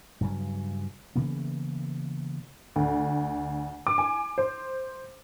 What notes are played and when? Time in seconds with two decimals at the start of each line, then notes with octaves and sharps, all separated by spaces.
0.21 G2 C#3 F#3
1.16 C#3 E3 A#3 B3
2.76 D2
3.87 D6
3.98 G#5
4.38 C5